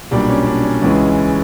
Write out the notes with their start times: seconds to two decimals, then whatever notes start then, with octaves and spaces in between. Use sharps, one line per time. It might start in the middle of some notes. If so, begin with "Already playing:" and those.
0.11 B1 A#2 G3 D4
0.29 C#4
0.47 D4
0.65 C#4
0.82 C#2 C#3 E3 G#3